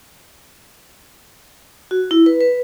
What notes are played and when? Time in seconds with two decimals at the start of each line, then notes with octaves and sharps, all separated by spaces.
1.91 F#4
2.11 E4
2.26 B4
2.41 B4